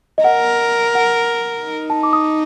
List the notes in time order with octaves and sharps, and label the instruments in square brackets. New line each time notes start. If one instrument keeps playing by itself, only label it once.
[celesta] D#5
[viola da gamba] A#4 [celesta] F#5
[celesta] F#5
[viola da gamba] D#4
[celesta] A5
D6
D#6